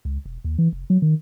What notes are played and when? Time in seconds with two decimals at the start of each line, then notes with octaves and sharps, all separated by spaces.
0.05 C#2
0.25 E1
0.44 D#2
0.58 E3
0.73 F1
0.90 F#3
1.02 D#3